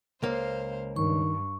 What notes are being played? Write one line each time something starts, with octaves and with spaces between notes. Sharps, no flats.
C#2 A#3 C5 F5
G2 D#3 C#6